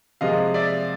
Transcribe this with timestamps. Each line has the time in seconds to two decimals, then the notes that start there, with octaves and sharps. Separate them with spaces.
0.21 C3 F3 G#3 D#5 F5
0.54 D5 E5